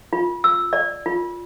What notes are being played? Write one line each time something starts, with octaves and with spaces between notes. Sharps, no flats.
F4
E6
D5
F4